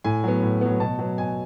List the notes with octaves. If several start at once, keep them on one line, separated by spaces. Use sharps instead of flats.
A2 G#5
F#3 B3
A2
F#3 B3
B2 A5
F#3 B3
B2 G#5